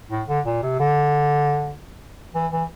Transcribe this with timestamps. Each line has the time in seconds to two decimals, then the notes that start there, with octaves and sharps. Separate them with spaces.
0.11 A2
0.28 D3
0.46 A#2
0.63 C3
0.80 D3
2.35 E3
2.52 E3